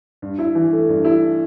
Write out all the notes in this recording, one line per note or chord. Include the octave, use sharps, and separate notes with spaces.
G2
E4
E3
A3
G2
E4